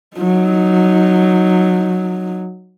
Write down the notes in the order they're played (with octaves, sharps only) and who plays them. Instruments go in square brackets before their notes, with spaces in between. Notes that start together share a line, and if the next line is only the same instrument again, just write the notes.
[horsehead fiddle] F#3 D#4